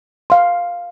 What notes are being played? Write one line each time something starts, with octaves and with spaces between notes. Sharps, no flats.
F5 C6